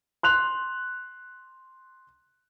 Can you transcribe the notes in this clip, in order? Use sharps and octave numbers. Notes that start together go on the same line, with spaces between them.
C6 F#6 F7